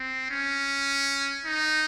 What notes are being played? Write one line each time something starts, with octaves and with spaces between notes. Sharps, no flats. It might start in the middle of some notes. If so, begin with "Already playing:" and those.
Already playing: C4
C#4
D#4